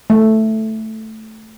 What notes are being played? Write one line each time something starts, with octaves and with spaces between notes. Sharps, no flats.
A3